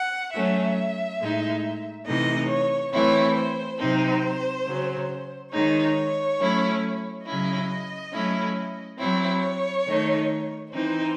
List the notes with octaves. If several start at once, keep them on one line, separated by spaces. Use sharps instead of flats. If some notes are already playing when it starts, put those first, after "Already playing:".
Already playing: F#5
F#3 A3 C#4 E5
A2 G#3 D#4
C3 E3 A3 D#4 D#5
C#5
E3 A3 C4 E4 C#5
C5
C3 F#3 C4 D#4 C5
C#3 F#3 C#4
D#3 G#3 D#4 C#5
F#3 A3 C#4 E4
C#3 F#3 C#4 E4 D#5
F#3 A3 C#4 E4
F#3 C4 E4 C#5
D#3 A3 D#4
E3 C4 D#4 C5